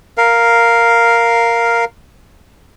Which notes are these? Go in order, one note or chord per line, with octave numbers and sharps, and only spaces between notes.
A#4 F5